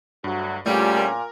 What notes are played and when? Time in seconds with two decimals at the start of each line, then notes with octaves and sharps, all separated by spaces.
0.24 D2 G2 F#3 F#4
0.66 E2 A#2 D3 G3 A3 C#4 F4
0.97 A#4